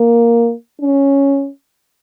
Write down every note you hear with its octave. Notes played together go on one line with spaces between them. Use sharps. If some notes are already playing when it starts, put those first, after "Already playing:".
Already playing: A#3
C#4